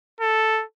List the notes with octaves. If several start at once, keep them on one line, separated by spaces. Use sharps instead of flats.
A4